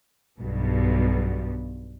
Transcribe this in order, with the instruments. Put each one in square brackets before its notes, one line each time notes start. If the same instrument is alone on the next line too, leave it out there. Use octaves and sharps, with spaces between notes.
[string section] B1 G2 B2